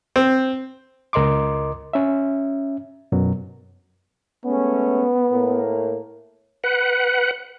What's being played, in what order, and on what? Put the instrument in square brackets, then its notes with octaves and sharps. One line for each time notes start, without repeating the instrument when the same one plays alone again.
[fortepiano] C4
[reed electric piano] C#2 A#4 D#5 C6 D6
C#4 E5
F#2 B2 F#3
[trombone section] G#3 A3 C#4 [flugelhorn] B3
[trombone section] A2 A#3 A#4
[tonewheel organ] B4 F#5